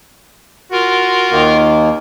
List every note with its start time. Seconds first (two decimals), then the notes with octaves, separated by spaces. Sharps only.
0.72 F4 F#4 A#4
1.31 D#2 D#3 A#3